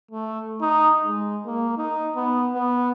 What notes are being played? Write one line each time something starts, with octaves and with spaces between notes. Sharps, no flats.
A3
D#4
G#3
A#3
D#4
B3
B3